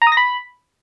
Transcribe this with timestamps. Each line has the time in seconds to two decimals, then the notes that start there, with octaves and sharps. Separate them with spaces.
0.02 A#5
0.07 D#6
0.12 A#6
0.17 B5